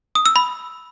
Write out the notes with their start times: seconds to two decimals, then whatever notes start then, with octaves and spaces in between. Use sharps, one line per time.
0.15 D#6
0.26 E6
0.36 B5